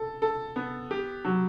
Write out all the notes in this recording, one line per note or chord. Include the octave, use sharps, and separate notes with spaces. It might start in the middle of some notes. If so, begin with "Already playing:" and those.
Already playing: A4
A4
B3
G4
F#3